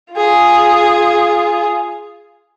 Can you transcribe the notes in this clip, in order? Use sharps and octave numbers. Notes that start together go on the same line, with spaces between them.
F4 G#4